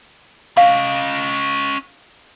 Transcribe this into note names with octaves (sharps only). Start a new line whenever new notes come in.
C#4 D#5 F5